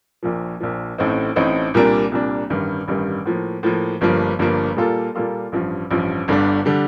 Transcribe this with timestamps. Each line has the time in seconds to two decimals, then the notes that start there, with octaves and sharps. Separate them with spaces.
0.23 A#1 A#2 F3
0.60 A#1 A#2 F3
0.98 A1 A2 A3 C4 D#4
1.36 A1 A2 A3 C4 D#4
1.74 C2 A#2 G3 A#3 D4
2.12 C2 A#2 G3 A#3 D4
2.50 A1 G2 D#3 G3
2.88 A1 G2 D#3 G3
3.26 A2 F3 A#3
3.63 A2 F3 A#3
4.01 G1 G2 F3 A#3
4.39 G1 G2 F3 A#3
4.76 A#2 G3 A#3 F4 A4
5.15 A#2 G3 A#3 F4 A4
5.52 A1 G2 F3
5.91 A1 G2 F3
6.28 G1 G2 D3 G3 D4
6.65 D3 G3 D4